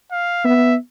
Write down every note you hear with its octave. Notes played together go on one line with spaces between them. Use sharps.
F5
B3 E5